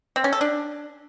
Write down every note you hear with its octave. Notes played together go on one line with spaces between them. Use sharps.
C4
C#4
A4
D4